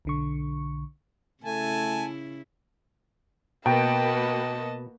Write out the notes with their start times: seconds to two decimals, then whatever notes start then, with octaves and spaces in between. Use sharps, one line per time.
0.05 B1 D3 C#6
1.44 C#3 A3 E4 G#5 A5
3.66 B2 A#3 F#4 B4 D#5 G5 A5